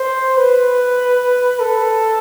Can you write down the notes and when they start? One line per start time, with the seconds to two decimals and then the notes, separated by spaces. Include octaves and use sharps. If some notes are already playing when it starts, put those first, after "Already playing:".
Already playing: C5
0.37 B4
1.60 A4